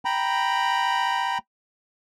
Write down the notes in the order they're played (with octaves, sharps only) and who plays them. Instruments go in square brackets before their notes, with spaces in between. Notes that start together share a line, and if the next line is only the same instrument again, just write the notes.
[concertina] G5 A#5 B5